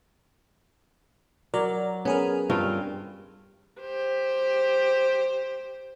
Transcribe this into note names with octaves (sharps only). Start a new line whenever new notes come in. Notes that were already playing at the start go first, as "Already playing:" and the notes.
F#3 A#4 D5
B3 C#4 G#4 A#4
G2 C4 F4
G4 C5